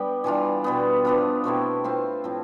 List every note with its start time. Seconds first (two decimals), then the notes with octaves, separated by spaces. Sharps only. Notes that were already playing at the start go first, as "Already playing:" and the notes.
Already playing: G3 B3 D4 G4 D5
0.24 E3 G3 D4 F4
0.64 B2 G3 B3
1.05 F3 B3 D4 F4
1.44 B2 A3 C4 E4
1.84 C4 F4 B4 F5
2.24 A2 F3 C4